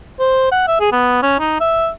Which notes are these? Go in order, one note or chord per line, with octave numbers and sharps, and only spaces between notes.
C5
F#5
E5
G#4
B3
C#4
D#4
E5